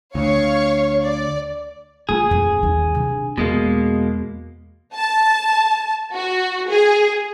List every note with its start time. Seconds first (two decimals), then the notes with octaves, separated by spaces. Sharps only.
0.15 D2 C#5 F5 C#6
1.02 D5
2.09 A#3 F4 G#4
2.31 F2
2.63 D#2 D#3
2.95 C3 D4
3.38 E2 B2 G#3 A#3
4.94 A5
6.14 F#4
6.69 G#4